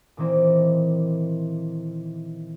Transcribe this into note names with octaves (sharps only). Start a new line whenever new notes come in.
A#2 D#3 E3 A#3 C4